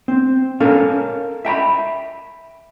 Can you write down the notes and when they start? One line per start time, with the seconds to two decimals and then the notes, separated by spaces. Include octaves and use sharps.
0.08 C4
0.60 C#4 A4 A#4 F5
1.45 E5 G5 A#5 B5